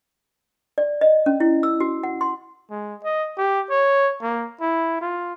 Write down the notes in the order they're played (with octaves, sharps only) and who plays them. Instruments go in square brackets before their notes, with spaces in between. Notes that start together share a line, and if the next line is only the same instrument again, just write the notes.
[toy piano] D5
D#5
C#4
E4
E6
F#4
F#5
C6
[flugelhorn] G#3
D#5
G4
C#5
A#3
E4
F4